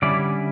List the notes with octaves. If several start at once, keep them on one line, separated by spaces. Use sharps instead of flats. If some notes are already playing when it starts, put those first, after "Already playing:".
D3 G3 C#4 E4 D5